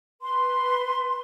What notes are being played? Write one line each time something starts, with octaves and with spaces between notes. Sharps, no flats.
B4 C6